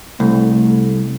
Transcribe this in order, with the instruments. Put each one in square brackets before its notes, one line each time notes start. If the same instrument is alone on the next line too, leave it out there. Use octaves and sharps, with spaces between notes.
[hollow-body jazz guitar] C2 [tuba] A3